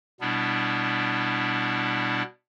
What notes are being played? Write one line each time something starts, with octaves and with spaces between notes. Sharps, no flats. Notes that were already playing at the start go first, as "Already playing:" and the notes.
B2 G3 B3 D4 E4